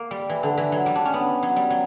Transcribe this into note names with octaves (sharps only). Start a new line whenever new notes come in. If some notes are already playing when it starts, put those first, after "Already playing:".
Already playing: A#3
G3
E3
D3
E3
F#3
G3
D4
C#4
B3
F#3
G3
F#3